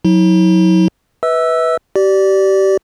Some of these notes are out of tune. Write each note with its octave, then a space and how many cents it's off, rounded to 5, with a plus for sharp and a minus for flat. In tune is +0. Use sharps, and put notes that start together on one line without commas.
F#3 -25 E4 -40
B4 +0 E5 -40 E6 +0
G4 -30 D5 +0